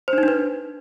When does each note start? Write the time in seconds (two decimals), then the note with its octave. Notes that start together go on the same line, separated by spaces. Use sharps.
0.08 C5
0.13 D4
0.18 D#4
0.23 D4
0.28 B4